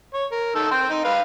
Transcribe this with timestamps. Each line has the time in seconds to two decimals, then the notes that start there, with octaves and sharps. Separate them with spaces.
0.14 C#5
0.32 A#4
0.55 D#3 A4 E6
0.71 G5 C6
0.90 D#4
1.05 B4 F5